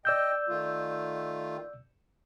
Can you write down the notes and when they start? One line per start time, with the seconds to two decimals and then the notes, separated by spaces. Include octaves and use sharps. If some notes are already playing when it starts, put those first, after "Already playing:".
0.05 D5 D#5 G5 E6 G6
0.48 D#3 A3 F4